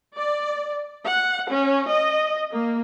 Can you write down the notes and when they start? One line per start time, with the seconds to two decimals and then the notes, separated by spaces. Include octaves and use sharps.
0.16 D5
1.06 F#5
1.50 C#4
1.90 D#5
2.51 A#3